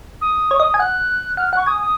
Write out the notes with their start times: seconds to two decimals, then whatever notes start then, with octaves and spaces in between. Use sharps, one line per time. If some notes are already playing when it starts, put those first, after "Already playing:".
0.21 D#6
0.51 C#5
0.60 D#5
0.74 G#5
0.79 F#5 F#6
1.37 F#5 F6
1.53 F#5 C#6
1.66 G#5 D#6
1.82 D#6